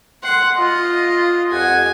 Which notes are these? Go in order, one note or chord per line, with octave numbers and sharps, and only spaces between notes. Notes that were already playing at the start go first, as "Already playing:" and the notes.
F#5 C6
F4 D#5
F2 G4 F#5 G#5